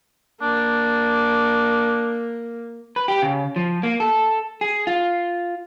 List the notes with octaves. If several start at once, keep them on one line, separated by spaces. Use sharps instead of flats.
A#3 D4
B4
G4
C#3
F3
A#3
A4
G#4
F4